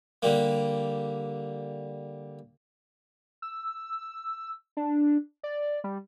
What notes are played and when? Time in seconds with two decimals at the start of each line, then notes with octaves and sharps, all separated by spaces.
0.22 D3 G3 A#3
3.42 E6
4.77 D4
5.43 D5
5.84 G3